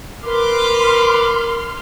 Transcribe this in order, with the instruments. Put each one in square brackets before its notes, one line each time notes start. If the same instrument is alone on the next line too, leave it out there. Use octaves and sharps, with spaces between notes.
[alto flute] A#4 [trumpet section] B4 D6 [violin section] C6 F6